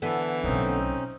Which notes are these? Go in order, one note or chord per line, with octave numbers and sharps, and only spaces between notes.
D3 E3 B3 A4
B1 A2 C4 C#4 D#4